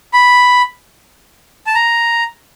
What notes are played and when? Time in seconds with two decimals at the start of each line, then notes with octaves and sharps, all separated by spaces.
0.13 B5
1.67 A5
1.75 A#5